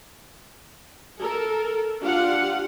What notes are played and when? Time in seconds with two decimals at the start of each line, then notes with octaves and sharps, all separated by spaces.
1.20 A4 A#4
2.00 D4 F4 G4 F5 F#5